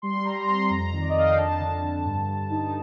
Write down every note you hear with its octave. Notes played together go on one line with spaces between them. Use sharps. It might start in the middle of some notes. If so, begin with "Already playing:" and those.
G3 C6
G3 A#5
C4 C6
C6
F2 A#5
D#3
D5
D#5
F2 F5
G5
D4 A5
D3
D3
G2
G2
D#4